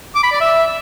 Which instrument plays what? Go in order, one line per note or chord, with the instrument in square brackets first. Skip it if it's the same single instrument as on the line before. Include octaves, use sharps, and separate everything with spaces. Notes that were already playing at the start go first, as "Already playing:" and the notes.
[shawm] D6
B5
D5
E5